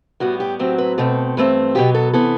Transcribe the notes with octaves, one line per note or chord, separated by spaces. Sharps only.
A2 G3 B3 F#4
G4
A2 F#3 C4 G4
B4
B2 A3 C4 A4
G2 E3 A3 C4
B2 F#3 B3 G4
A4
C3 E3 B3 A4